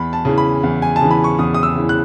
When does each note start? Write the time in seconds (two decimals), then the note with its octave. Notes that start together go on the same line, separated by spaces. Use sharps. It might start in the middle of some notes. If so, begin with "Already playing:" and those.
Already playing: E2 B5
0.13 A5
0.25 C#3 E3
0.38 B5
0.63 E2
0.82 G#5
0.96 A5
1.01 C#3 E3
1.11 B5
1.24 C#6
1.39 E2 D#6
1.54 D#6
1.63 E6
1.76 C#3 E3
1.89 F#6